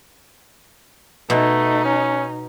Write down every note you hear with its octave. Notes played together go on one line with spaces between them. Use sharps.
B2 A3 D#4
C#4